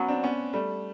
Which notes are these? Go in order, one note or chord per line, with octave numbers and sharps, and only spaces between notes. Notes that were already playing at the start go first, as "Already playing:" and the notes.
Already playing: F#3 B3 C#4
C4 D4
B3 C#4
G3 A3